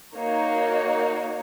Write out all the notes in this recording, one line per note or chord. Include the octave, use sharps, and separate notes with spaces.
A#3 D#4 F#4 C#5